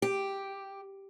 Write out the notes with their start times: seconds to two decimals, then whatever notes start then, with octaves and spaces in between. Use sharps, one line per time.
0.02 G4